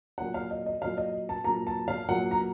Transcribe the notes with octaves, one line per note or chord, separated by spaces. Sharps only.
A#2 F#3 A#3 F#5
F5
D#5
D#5
A#2 F#3 A#3 F5
D#5
A5
A#2 F#3 A#3 A#5
A5
F5
A#2 F#3 A#3 F#5
A#5